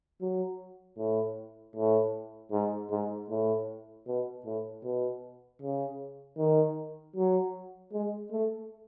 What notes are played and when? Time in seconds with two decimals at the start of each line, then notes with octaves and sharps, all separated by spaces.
0.21 F#3
0.98 A2
1.76 A2
2.52 G#2
2.90 G#2
3.30 A2
4.07 B2
4.45 A2
4.83 B2
5.61 C#3
6.38 D#3
7.16 F#3
7.93 G#3
8.31 A3